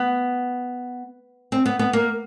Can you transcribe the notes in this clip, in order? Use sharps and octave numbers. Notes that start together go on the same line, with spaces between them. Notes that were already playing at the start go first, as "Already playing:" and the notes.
Already playing: B3
C4
B3
B3
A#3